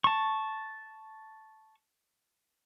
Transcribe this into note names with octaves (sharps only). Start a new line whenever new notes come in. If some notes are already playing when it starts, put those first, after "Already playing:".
A5 C#6